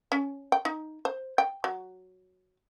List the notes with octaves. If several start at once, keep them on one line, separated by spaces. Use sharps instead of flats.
C#4
G5
D#4
C5
G5
F#3